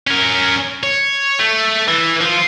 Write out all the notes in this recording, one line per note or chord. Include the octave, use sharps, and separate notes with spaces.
C#4 A#4
C#5
A3
E3
F3 F4